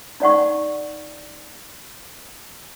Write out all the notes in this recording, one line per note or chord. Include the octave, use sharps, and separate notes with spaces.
D#4 D5 F#5 C#6